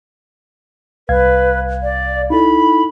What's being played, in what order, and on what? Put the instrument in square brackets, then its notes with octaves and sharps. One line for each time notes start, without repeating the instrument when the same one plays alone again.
[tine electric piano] C2 F5 G#6 [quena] B4
[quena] D5
[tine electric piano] D#4 E4 A4 [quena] B5